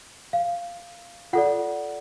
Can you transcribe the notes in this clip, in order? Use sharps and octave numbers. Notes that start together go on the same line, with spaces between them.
F5
F4 A4 D5 F#5